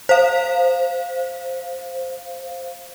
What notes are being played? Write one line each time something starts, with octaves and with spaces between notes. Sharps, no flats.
C5 F5